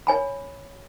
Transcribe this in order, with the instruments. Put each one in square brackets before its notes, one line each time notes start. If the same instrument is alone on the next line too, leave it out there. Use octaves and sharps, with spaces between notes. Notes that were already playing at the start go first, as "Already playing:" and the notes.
[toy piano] C#5 G#5 B5